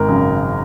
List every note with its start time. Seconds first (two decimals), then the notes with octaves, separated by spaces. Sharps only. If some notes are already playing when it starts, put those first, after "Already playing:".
Already playing: G#1 A#4
0.08 F#2 C#3